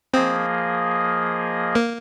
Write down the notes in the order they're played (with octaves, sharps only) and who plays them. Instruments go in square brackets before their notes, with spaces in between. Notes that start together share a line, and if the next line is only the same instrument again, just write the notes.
[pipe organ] F3 A#3 G#4 D#5 [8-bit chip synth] C4
[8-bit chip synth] A#3